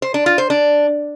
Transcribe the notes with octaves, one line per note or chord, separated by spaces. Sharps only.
C5
D4
F4
C5
D4